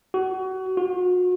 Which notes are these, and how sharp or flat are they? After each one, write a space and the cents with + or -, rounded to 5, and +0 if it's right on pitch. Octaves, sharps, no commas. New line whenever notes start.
F#4 +25
F#4 -40